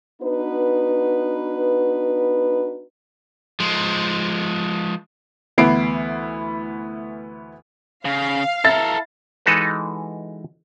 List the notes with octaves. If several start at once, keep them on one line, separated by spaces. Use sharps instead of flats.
B3 D4 D#4 F#4 B4
F3 G#3
D2 E3 B3 E4 C7 D7
C#3 F5
E4 A4 A#4 A6
E3 G#3 D#4 F#4 A4 B4